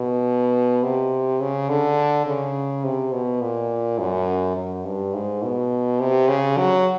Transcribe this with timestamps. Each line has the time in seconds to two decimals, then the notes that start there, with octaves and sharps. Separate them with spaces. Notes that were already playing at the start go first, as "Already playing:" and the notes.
Already playing: B2
0.83 C3
1.40 C#3
1.69 D3
2.26 C#3
2.84 C3
3.12 B2
3.41 A#2
3.99 F#2
4.57 F#2
4.85 G2
5.14 G#2
5.42 B2
5.99 C3
6.28 C#3
6.57 F#3